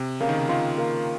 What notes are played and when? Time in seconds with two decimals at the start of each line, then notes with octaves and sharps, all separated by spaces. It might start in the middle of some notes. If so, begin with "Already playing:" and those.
Already playing: C3
0.20 C#3 A#3
0.29 D#3
0.38 C#3
0.49 D#3 F4
0.78 A#3